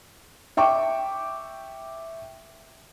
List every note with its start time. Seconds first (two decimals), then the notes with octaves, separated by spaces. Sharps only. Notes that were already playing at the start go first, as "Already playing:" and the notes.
0.57 E5 G5 C#6 D6